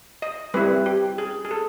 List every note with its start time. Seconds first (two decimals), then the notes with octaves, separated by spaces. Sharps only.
0.22 D#5
0.54 G3 C4 E4 B4
0.86 G4
1.18 G#4
1.45 G#4
1.51 A4